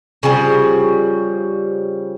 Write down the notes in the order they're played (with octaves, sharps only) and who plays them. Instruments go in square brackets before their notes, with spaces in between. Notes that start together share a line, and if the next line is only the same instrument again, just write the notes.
[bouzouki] C#3 F3 G3